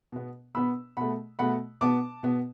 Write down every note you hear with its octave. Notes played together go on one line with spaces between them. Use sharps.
B2 B3
B2 B3 B5 E6
B2 A3 F#5 B5
B2 A3 F#5 B5
B2 B3 A5 D6
B2 B3